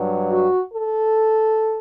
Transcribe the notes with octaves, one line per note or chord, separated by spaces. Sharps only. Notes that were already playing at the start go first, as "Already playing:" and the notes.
Already playing: G2 F#3
F#4
A4